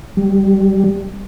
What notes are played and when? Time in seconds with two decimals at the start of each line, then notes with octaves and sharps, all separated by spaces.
0.17 G3